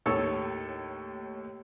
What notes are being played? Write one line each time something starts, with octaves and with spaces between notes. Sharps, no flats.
D#2 A2 A4 C#5 C#6